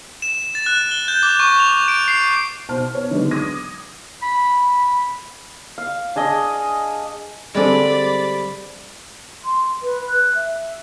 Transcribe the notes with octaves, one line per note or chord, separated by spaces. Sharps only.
E7
A6
F#6
G7
G6
D6
C#6
F7
D7
C7
B2 C5 A5 F6
B3 C#5
D3 D#3 F#3 G#3 B3 D4
D6 D#6 G#6 A#6 D#7
B5
F5
D4 G#4 D#5
D3 G3 G#3 C4 D5 B5
C6
B4
F#6
E5